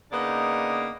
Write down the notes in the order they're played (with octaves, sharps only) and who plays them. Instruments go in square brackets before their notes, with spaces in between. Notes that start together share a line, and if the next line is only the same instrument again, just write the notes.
[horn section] C#3 A#3 B3 D4 D#4